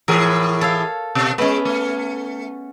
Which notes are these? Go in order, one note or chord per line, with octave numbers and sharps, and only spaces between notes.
A2 E3 G#4 A#4
A4 C#5 F5
B2
G#3 B3 C#4
A3